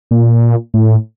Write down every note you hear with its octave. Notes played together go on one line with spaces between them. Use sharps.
A#2
A2